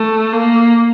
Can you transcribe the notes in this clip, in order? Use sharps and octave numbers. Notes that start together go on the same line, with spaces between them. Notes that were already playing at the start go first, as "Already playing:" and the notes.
Already playing: A3
A#3